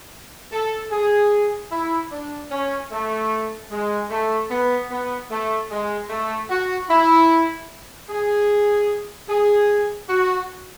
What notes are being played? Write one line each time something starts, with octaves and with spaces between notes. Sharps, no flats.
A4
G#4
E4
D4
C#4
A3
G#3
A3
B3
B3
A3
G#3
A3
F#4
E4
G#4
G#4
F#4